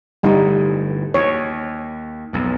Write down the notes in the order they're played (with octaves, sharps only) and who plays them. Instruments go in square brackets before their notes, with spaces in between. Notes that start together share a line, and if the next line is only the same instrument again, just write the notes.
[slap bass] G1 A2 [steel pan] G3 D#4
[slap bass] D#2 [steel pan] C#5
[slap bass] B1 F2